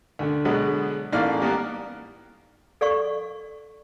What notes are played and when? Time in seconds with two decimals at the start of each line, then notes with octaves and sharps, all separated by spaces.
0.19 D2 D3
0.45 B2 D3 F#3 G#3 B3
1.12 A1 G#2 A#3 D5 F5 F6
1.40 G3 A#3 B3 A#4
2.81 A4 D5 F5 C#6